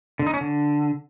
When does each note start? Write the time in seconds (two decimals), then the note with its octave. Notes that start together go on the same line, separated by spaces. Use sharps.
0.19 D3
0.27 D#4
0.34 C#4
0.41 D3